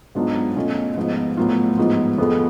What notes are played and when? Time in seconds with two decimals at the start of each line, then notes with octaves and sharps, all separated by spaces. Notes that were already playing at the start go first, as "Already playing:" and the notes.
0.15 G#2 F#3 B3 D4 F4
0.56 B2 A3 C#4 F4
0.96 G#2 F3 B3
1.37 A2 F#3 B3 F4
1.77 G#2 F3 B3 F4
2.18 F2 F3 G#3 B3